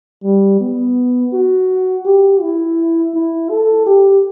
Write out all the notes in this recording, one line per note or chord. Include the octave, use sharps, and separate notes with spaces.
G3
B3
F#4
G4
E4
E4
A4
G4